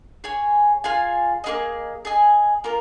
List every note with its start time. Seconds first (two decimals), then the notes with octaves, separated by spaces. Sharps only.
0.24 G#4 C#5 G#5
0.84 F4 G#4 F5 G#5
1.44 A#3 F4 G#4 D#5
2.05 G#4 D#5 G#5
2.64 A#3 F4 A#4